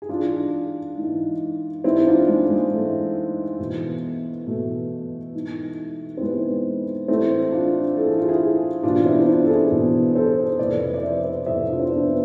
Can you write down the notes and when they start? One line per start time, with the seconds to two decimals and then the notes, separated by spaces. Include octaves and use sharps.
0.02 G#4
0.09 G#2 E3 D4 F4
0.97 G#2 E3
1.84 G#2 E3 C4 E4
2.06 D4 F4
2.28 G#3
2.50 G#3
2.72 G#2 E3 A3
3.59 E2 B2
4.47 E2 B2 A3
5.35 G#2 E3
6.17 C4
6.21 G#2 E3 G#3 B3
7.08 A2 E3 A3 C4
7.52 D4 F4
7.96 A2 E3 A4
8.07 G#4
8.18 F4
8.29 E4 G#4
8.83 E2 B2 D4 F4
9.05 C4 E4
9.21 E4
9.28 D4 F4
9.44 A4
9.49 E4 G#4
9.71 E2 B2
10.15 A4 C5
10.58 F2 C3 E3 B4 D5
10.80 B4 D5
10.94 D5
11.02 C5 E5
11.24 B4 D5
11.46 F2 C3 E3 C5 E5
11.68 D4 F4
11.80 C4
11.89 B3 D4
12.07 B3